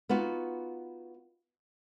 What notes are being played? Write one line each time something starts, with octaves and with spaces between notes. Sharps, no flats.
B3 D#4 F4 F#4